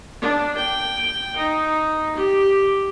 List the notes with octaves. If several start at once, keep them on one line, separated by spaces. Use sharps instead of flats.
D4
G5
D#4
G4